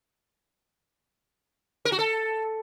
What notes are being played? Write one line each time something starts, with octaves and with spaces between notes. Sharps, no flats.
A#4
F#4
A4